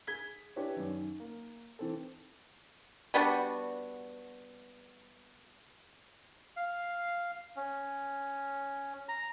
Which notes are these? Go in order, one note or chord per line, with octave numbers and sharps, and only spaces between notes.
G#4 G#6 B6 G7
C#4 D4 E4 G4 B4 C#5
F#2 D#3
A#3
E3 C4 A4
G3 B3 D4 F#4
F5
C#4
A#5